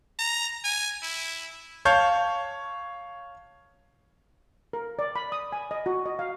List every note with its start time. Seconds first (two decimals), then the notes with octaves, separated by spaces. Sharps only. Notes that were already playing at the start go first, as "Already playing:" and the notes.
0.19 A#5
0.64 G#5
1.03 E4
1.85 C#5 F5 A5 G6
4.73 A#4
4.99 D5
5.16 B5
5.32 D#6
5.52 G#5
5.71 D#5
5.86 F#4
6.06 D#5
6.19 F5